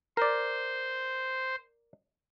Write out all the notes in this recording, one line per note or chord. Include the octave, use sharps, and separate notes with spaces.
A#4 C5 D5